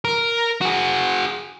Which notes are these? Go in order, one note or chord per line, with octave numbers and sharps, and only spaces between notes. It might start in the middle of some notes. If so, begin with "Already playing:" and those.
A#4
F#4 G#4